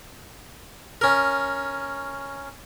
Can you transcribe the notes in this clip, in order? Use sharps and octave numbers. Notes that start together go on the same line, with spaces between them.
C#4 A#4